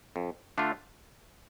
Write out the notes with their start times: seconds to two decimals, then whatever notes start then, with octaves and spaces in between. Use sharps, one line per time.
0.16 F2
0.58 D3 A3 D4 F4